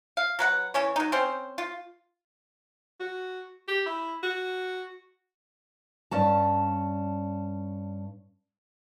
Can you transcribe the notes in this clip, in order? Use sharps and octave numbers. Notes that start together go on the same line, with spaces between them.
F5
F#3 B4 F#5
E3 C#4 C#5
F#3 D#4
C4 C#4 C5
F4
F#4
G4
E4
F#4
G2 C#4 A5